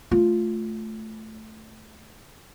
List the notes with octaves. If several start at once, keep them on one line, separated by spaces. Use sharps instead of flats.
A3 F4